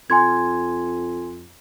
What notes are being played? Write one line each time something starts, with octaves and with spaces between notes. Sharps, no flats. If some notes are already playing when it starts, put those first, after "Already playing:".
F2 G#5 C6 G#6